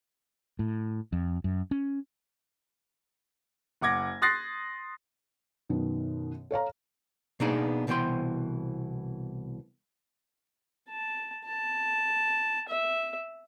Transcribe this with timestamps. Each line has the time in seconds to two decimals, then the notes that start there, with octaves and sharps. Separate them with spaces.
0.59 A2
1.13 F2
1.44 F#2
1.71 C#4
3.81 F#1 F#5 D6 G#6 A#6
4.22 C6 D#6 F#6 A6 A#6 C7
5.69 F#2 B2 D#3
6.51 A4 C#5 F5 A#5
7.40 B2 A#3 B3 D4 D#4 G#4
7.87 C2 B2 E3 C5 G5 C6
10.89 A5
11.45 A5
12.69 E5